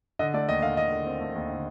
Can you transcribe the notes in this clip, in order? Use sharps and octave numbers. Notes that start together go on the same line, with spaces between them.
D3 D#5
A3 D5
D#2 D#5
D3 F5
D3 D#5
D3
C4
A3
D#2
D3